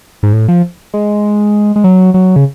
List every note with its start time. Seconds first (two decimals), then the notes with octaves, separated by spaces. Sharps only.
0.23 G#2
0.33 A2
0.48 F3
0.94 G#3
1.76 G#3
1.84 F#3
2.14 F#3
2.36 C#3